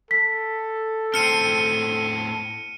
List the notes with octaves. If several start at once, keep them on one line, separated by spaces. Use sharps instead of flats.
A4 B6
A2 C4 F6 C#7 D#7